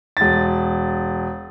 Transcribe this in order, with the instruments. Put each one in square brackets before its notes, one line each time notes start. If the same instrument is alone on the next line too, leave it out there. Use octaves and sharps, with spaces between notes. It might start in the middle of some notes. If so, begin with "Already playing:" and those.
[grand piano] E1 A6